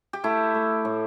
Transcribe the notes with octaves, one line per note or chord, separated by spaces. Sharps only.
G4
A3 E4
A3
A2